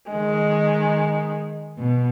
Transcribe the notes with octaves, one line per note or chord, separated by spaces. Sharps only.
D#3 G#3
B2